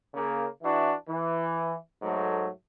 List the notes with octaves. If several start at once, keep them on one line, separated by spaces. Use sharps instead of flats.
C#3 A#3
E3 D4 E4 F#4
E3
G#2 F#3 A3